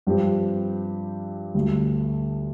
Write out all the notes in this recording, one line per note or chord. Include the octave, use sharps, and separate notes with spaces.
G2 F3 C4 G4
D2 D3 G3